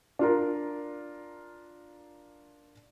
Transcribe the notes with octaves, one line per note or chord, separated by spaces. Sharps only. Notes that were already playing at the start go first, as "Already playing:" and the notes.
D4 F4 A#4